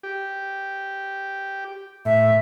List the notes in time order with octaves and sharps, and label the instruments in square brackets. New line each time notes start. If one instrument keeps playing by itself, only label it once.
[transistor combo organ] G4
[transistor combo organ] A2 [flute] E5